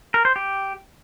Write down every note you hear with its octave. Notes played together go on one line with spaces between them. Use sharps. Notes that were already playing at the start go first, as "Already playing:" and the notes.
A#4
C5
G4